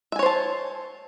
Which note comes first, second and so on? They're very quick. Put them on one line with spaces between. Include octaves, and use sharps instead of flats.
E5 G#5 C#5 C5 A5